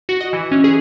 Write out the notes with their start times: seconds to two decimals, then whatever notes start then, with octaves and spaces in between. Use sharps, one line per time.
0.09 F#4
0.21 D#5
0.33 E3
0.52 C#4
0.64 G#4